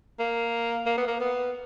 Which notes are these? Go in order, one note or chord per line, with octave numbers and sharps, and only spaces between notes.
A#3
A#3
B3
A#3
B3